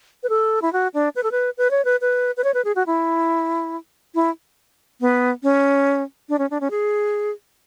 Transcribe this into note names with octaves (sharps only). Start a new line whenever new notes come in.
B4
A4
E4
F#4
D4
B4
A4
B4
B4
C#5
B4
B4
B4
C#5
B4
G#4
F#4
E4
E4
B3
C#4
D4
C#4
D4
C#4
G#4